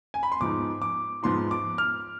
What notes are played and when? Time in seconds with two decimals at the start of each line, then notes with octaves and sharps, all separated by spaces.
0.14 G#5
0.23 B5
0.32 C6
0.40 G#2 F3 B3 D#4 D6
0.82 D6
1.23 G#2 F3 B3 D#4 C6
1.51 D6
1.78 F6